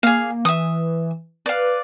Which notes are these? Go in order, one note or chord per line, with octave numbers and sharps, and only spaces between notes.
A#3 G#4 F5
E3 E5 D#6
B4 D5 F5